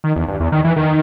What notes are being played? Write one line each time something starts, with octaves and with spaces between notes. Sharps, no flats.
D#3
E2
G2
E2
D#3
E3
D#3